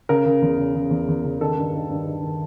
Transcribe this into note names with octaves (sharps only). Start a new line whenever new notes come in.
C#3 A#4
C#3
E2
C#3
C#3
E2
E2
C#3
D#3 A4
G2
D#3
G2
D#3
D#3